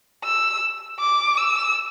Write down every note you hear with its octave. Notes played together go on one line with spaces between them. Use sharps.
E6
D6
E6